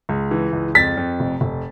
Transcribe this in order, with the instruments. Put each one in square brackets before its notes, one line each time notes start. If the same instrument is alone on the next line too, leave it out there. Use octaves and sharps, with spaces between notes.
[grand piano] C#2
E3
C#2
F2 A6 B6
F2
F1
F1